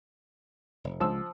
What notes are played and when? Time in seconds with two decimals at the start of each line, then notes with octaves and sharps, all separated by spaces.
0.84 F1
1.00 C#2 F3 G#3 E6